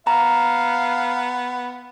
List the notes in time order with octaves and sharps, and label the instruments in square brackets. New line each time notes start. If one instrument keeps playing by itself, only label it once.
[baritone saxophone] B3 [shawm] F5 [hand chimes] A#5